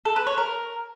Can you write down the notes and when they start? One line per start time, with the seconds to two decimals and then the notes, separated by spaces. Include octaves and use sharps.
0.05 A4
0.16 B4
0.27 C#5
0.37 A#4